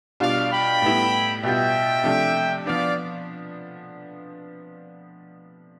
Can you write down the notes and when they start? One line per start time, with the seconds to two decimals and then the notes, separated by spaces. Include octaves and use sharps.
0.20 B2 G3 D4 F4 D5 F5
0.51 G5 B5
0.82 A2 G3 B3 E4
1.43 B2 G3 B3 F4 E5 G5
2.04 C3 F3 A3 D4
2.65 F3 B3 D4 D5 F5